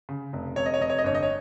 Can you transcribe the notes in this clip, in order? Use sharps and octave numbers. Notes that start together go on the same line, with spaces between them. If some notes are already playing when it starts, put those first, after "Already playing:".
C#3
F1
F1 C#5
D#5
C#5
F1 D#5
C#5
D#5
G1 C#5
D#5
C#5